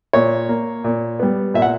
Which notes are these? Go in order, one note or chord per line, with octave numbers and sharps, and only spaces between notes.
A#2 C#5
A#3
A#2
G3 B3
A#2 E5
F#5